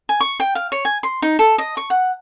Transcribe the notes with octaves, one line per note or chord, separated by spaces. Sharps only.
G#5
C#6
G5
F5
C#5
G#5
C6
D#4
A4
D#5
C#6
F#5